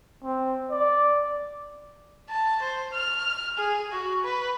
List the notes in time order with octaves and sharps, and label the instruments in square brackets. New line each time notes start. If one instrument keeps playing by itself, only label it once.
[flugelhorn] C4
D5
[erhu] A5
C5
F6
G#4
F#4
B4